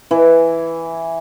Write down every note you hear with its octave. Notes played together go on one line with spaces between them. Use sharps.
E3